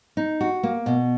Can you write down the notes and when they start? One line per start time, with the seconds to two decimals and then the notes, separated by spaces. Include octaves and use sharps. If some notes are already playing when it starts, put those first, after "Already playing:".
0.17 D#4
0.41 F#4
0.63 A#3
0.86 B2